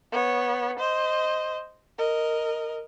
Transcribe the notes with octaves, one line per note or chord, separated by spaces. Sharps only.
B3 C#5
C5 D#5
A#4 D#5